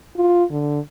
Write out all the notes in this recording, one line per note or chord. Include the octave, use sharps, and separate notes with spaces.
F4
D3